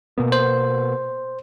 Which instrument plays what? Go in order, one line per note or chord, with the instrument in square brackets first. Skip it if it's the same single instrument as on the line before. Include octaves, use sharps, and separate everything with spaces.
[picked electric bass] B2 A#3 B3
[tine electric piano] C5